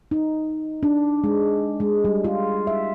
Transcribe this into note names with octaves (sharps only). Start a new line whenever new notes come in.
D#4
D4
G#3
G#3
G3
F4
E5